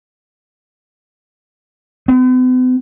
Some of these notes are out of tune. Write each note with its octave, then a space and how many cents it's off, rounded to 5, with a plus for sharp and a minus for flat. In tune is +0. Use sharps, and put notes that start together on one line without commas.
B3 +45